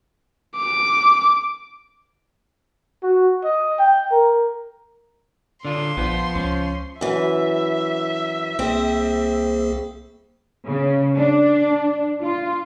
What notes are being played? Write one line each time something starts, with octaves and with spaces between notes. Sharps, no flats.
D6
F#4
D#5
G5
A#4
D3 D4 F4 C6
A#1 F3 B3
C#2 C#4
F#2 E3 E5
C2 A#3 C4 G#4
C#3
D4
F4